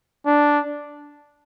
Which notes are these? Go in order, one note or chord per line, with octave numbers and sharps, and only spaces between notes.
D4